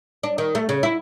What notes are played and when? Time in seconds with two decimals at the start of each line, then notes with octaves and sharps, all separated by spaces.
0.23 D4
0.38 D#3
0.55 A3
0.69 C#3
0.83 E4